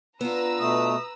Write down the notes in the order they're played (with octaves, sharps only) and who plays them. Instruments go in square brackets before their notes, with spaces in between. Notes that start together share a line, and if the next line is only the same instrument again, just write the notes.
[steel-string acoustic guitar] B3 D4 F4 [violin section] B4 A#5 E6
[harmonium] B2 A3 [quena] D#6